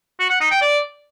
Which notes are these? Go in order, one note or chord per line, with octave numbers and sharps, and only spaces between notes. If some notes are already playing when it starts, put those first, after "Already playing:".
F#4
F#5
D#4
G5
D5